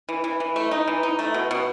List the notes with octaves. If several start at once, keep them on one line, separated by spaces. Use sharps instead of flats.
E3
E3
E3
A3
D#4
E3
D#4
A3
B2
B2